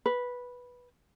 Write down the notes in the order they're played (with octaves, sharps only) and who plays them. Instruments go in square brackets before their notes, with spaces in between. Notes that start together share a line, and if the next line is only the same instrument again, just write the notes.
[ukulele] B4